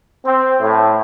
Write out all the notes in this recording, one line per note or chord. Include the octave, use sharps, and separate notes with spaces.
C4
A2